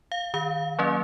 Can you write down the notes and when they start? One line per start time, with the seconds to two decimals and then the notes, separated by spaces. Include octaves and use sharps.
0.12 F5
0.34 D#3 F5
0.79 F#3 A#3 C#4